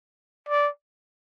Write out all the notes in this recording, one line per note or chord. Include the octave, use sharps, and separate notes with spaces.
D5